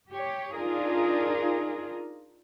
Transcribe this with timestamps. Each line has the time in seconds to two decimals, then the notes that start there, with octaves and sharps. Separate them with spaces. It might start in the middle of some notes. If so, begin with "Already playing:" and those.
0.11 G4 C#5
0.53 D4 D#4 F4 G#4 A#4